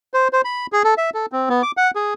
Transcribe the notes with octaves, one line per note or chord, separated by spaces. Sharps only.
C5
C5
B5
G#4
A4
E5
A4
C4
B3
D6
F#5
G#4